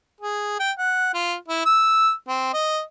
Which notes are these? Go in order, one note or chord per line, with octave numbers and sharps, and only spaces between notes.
G#4
G5
F#5
F4
E4
E6
C4
D#5